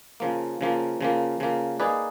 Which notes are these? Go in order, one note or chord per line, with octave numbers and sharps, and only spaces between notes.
C#3 F3 A#3
C#3 F3 A#3
C#3 F3 A#3
C#3 F3 A#3
A#3 D#4 G#4 B4 D5